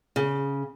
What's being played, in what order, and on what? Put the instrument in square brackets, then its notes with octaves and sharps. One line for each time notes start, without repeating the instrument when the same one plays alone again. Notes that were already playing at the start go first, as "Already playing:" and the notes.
[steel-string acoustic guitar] C#3